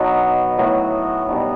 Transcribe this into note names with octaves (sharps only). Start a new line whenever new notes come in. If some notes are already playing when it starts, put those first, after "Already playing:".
Already playing: B2 F#3 B3 D#4
A2 F#3 B3 F#4
B2 G3 B3 D#4